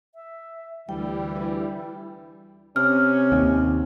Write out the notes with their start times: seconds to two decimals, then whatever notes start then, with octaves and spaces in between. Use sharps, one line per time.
0.15 E5
0.89 D2 E3 G3 E4 G5
2.76 C3 C#4 F6
3.32 D#2